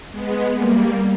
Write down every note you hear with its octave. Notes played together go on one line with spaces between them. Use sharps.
G#3 B3
G3 A#3